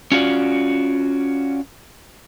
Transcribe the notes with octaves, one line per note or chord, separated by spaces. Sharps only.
C#4 F4 F#4 D5